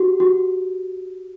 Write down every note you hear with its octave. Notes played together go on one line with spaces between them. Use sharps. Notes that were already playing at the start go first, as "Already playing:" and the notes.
Already playing: F#4 G4
F#4